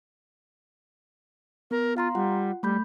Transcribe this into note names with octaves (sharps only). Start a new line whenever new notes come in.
B3 A#4
F4 F5 A#5 C6
G3 F4 F#5
G3 A3 B5 G6